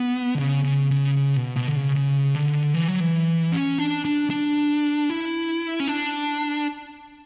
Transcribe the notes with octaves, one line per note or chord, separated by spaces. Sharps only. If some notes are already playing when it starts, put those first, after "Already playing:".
Already playing: B3
D3
C#3
C#3
C#3
C#3
B2
B2
D3
C#3
C#3
D3
E3
F#3
E3
C#4
D4
D4
D4
E4
C#4
D4